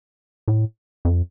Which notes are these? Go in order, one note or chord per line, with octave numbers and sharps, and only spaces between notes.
A2
F2